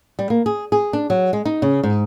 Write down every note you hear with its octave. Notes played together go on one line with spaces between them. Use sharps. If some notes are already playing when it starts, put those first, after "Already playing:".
G3
A#3
G#4
G#4
D4
F#3
G#3
D#4
C#3
G#2